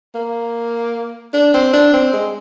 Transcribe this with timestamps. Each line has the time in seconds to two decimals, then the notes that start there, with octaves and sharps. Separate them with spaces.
0.15 A#3
1.33 D4
1.54 C4
1.73 D4
1.93 C4
2.13 G#3